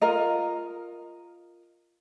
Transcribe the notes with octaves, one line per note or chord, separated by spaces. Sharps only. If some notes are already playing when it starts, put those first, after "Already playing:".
F4 A#4 D#5